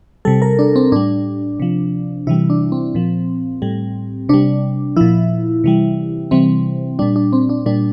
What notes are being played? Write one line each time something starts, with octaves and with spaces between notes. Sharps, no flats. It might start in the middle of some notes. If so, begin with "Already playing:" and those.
C3 G3 A4
A#4
D4
C4
A2 G3 D4
C3 F3
C3 E3 G3 E4
D4
C4
A#2 F3
A2 G3
C3 G3 D4
A#2 F3 E4
C3 E3 G3
C3 E3 G3 C4
A#2 G3 D4
D4
C4
D4
A#2 G3 D4